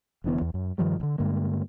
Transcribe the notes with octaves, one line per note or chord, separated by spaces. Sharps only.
F1 D3 E3 B3
E2
F#2
G2 D#3 F3 G3
A1 D3
G2 D3 G#3 A#3